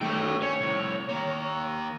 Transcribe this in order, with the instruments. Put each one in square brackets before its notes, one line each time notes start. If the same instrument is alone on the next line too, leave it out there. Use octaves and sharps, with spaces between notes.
[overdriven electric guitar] D#3 A3 [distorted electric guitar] C#5 G5
[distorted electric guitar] C#4 [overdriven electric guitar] C#5
[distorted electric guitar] C2 A2
D#3 A#3